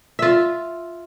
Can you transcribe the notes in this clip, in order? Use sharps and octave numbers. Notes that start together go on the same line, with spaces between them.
F4 E5